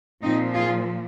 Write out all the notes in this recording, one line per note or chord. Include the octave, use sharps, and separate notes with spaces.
A#2 F3 C4 D#4
F4 G#4